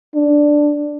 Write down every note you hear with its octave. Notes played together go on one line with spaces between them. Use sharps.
D4